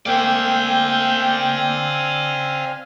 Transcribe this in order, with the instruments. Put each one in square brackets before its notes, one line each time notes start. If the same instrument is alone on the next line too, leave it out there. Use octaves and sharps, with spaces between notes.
[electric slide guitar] A3 A#3 [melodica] C4 F5 G#5 [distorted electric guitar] D5 E5 [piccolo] G5